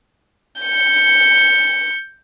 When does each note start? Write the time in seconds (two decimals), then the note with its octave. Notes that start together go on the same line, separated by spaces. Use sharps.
0.62 G6 C#7